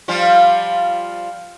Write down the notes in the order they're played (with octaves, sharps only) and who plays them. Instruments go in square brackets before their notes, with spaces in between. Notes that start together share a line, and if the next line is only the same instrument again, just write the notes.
[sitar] F3 G3 F4